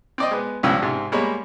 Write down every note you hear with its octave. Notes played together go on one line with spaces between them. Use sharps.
C4 D5 D#5
G#3 B3
C#2 G2 F3 E6
G#2 C3
G3 G#3 A#3 C#5 B5